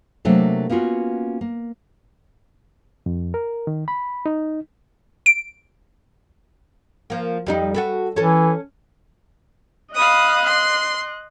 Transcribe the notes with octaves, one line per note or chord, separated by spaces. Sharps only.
C3 F#3 A3 A#3 D4 A4
A#3 B3 C#4 F4 F#4
A#3
F2
A#4
D#3
B5
D#4
D7
F3 A#3
F2 G3 D#4
F#4 A4 B4
E3 C#4 A4
D#5 F5 B5 D#6 F#6
C6